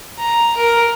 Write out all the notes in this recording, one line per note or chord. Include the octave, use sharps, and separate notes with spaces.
A#5
A#4